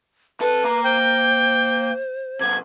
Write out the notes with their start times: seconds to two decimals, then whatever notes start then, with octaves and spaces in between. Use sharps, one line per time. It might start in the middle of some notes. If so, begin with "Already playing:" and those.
0.40 F2 A4 B4
0.64 A#3 A#5
0.84 C5 G5
2.40 C3 F#3 G#6